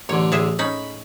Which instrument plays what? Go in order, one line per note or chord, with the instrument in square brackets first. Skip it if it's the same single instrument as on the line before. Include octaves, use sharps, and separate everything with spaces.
[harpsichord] A1 D3 [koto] C#5
[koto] A2 G#4 E5
[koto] C#4 D#4 [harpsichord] B5